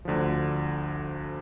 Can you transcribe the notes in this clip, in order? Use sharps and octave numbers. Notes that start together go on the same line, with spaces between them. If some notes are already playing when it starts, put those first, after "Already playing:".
D2 D3 F3